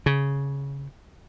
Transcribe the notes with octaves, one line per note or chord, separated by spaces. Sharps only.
C#3